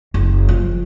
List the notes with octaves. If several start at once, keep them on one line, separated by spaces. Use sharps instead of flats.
F#1
F3